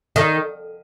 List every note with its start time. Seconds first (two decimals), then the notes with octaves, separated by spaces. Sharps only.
0.16 D#3